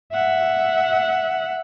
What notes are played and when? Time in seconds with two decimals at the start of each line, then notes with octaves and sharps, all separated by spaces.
0.13 E5 F#5